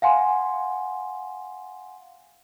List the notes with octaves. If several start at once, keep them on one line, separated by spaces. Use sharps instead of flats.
F5 F#5 G#5 C6